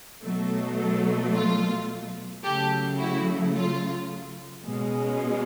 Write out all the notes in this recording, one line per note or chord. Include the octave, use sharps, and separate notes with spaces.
B2 F#3 A3
F4
C#3 F#3 A3 G4 A4
E4 F#4
F4
B2 G#3 C#4